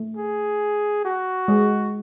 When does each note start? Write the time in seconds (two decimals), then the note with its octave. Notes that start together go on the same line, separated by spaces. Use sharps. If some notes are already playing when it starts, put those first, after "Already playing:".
Already playing: A3
0.17 G#4
1.05 F#4
1.48 G#3